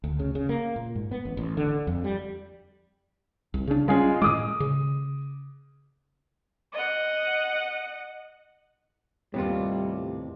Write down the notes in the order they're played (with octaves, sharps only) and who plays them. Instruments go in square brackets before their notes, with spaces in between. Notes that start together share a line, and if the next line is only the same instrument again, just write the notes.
[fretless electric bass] D2
C#3
C#3
A#3
A#2
G#2
B3
A1
A1
D3
F2
G3
C2
C#3 D4
[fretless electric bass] G3 C#4 [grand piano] G#3 F4 G#4
[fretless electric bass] A2 D#3 G#3 [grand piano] D6 D#6
[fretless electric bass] C#3
[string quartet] D#5 F#5
[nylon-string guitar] D#2 C3 [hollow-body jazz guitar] A2 B3 F4 [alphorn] G3